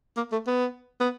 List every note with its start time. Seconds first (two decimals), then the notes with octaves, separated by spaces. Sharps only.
0.17 A#3
0.32 A3
0.47 B3
1.00 B3